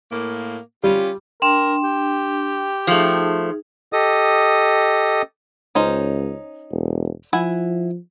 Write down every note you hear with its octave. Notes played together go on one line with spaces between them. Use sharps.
A2 A#3
G3 C#4 F4 G4
D4 A#4 G5 C6 E7
G4
F3 A3 D#4 G#4
G4 A4 D#5 D#6
C#2 C#4 D#4 C5
E1
F3 E4 F#5 G#5